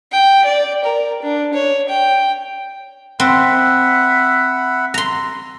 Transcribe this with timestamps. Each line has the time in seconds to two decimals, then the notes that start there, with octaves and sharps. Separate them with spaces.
0.12 G5
0.45 D5
0.84 A#4
1.22 D4
1.54 C#5
1.89 G5
3.20 C4 E5 F#5 B5
4.94 A#5 C6